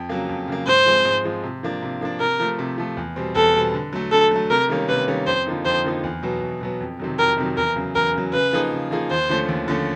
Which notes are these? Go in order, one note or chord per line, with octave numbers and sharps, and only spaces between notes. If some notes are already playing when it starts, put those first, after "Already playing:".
Already playing: F2
C#3 F#3 A#3
F2
C#3 F#3 A#3
G#2 C5
F3 G#3 C4
G#2
F3 G#3 C4
C3
F3 A#3 D4
C3
F3 A#3 D4
C3 A#4
F3 A3
C3
F3 A3
E2
B2 G3 C4
E2 A4
B2 G3 C4
D3
F#3 A3
D3 A4
F#3 A3
C3 A#4
D#3 G3 A#3 C#4
C3 B4
D#3 G3 A#3 C#4
F2 C5
D3 F3 A#3 D#4
F2 C5
D3 F3 A#3 D#4
E2
B2 F#3 B3
E2
B2 F#3 B3
F2
C3 D#3 F#3
F2 A#4
C3 D#3 F#3
E2 A#4
C#3 F#3
E2 A#4
C#3 F#3
C#3 B4
F3 A#3 D#4 G#4
C#3
F3 A#3 D#4 G#4
D#2 C5
D3 F3 A3 C#4
D#2
D3 F3 A3 C#4